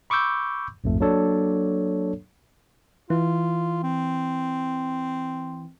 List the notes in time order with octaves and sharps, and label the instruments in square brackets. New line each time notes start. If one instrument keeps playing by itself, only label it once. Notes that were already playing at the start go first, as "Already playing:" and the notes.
[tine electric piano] B5 C#6 D6 E6 G6
A#1 F2 G#2 A3
F#3 A#3 D4 A4 C#5
[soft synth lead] E3 [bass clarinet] F4
[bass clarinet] C4